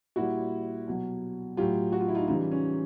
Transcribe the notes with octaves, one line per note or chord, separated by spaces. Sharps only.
A#2 G3 E4 F#4
B2 F#3
A2 F#3 F4 G4
F#4
F4
E4
D#4 F4
C#3 E3 G3 D#4 F4
C#4